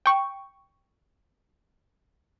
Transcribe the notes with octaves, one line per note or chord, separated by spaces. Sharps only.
G5 C#6